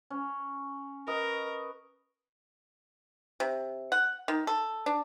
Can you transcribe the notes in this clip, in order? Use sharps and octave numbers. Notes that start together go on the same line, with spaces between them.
C#4
A#4 B4 D#5
C3
F#5
D#3
A4
D4